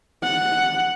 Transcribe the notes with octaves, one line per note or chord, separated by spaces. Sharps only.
F#5